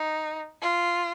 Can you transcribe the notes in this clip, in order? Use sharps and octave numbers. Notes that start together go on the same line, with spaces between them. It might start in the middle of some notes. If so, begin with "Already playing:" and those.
Already playing: D#4
F4